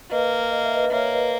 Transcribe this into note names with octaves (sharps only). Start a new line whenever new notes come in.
A#3 B4 D#5
D#5
E5
B4 D#5
A#3 C#5 E5
B4 D#5